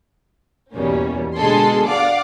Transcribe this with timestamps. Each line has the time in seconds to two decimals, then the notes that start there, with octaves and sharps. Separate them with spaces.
0.73 E2 B2 G3 A#3 C#4
1.37 B2 D3 G#3 G#4 A4 C6
1.87 D5 F5 F#5 D6